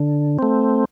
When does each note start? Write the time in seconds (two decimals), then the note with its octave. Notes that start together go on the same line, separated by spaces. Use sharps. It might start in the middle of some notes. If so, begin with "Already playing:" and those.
Already playing: D3
0.39 A3 C4